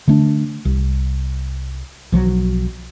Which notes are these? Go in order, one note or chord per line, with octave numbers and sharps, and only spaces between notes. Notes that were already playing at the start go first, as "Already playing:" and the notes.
D3 A3 D4
C2
B1 F3 F#3